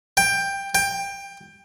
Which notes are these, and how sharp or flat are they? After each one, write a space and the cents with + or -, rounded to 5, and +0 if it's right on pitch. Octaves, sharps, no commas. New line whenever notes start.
G5 +15
G5 +20